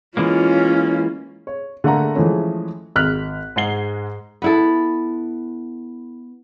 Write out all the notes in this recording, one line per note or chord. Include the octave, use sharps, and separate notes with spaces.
E3 G#3 A#3 C#4 F4
C#5
D3 A3 A#3 F#5 A#5
E3 F3 G#3 A3 C#4
G#1 F6 F#6 B6
G#2 G#3 F#5 C7 G7
B3 E4 A4